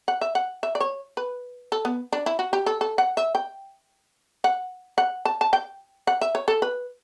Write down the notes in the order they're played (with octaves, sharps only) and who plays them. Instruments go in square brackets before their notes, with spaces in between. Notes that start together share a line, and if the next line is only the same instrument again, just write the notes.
[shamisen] F#5
E5
F#5
E5
D5
C#5
B4
A4
B3
D4
E4
F#4
G4
A4
A4
F#5
E5
G5
F#5
F#5
A5
A5
G5
F#5
E5
C#5
A4
B4